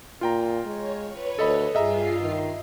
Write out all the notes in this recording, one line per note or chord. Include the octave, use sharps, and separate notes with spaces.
A#2 F4 G5 A#5
G#3 C#5
B4 C#5
D2 A4 D#5 B5
G2 F4 G#4 D#5 E5 A#5 C7
D#3